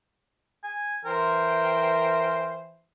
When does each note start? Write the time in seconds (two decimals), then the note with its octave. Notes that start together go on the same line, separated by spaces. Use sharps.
0.64 G#5
1.05 E3 A#4 C5 G5